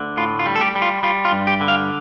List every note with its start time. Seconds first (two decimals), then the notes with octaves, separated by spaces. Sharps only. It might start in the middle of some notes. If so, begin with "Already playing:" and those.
Already playing: D2 D3
0.17 A2 F4
0.39 F4
0.46 G3
0.56 A4
0.61 G4
0.75 G3
0.82 F4
1.03 G3 F4
1.25 F4
1.32 G2
1.47 G4
1.61 D3
1.68 F5